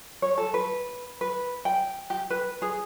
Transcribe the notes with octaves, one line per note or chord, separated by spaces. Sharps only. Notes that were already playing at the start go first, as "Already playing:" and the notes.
C#5
A4
B4
B4
G5
G4
B4
G#4